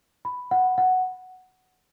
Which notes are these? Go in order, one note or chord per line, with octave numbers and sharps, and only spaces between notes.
B5
F#5
F#5